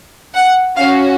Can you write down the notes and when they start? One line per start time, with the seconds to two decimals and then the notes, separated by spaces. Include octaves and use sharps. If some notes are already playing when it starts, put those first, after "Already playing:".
0.34 F#5
0.77 C#4 F#4 F5